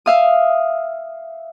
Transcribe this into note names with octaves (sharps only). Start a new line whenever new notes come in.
E5 F5 D#6